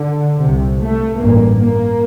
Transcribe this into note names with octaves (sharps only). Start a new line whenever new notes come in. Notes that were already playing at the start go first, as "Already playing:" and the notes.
Already playing: D3
C2 C3
A3
A1 G2 A#3
A#3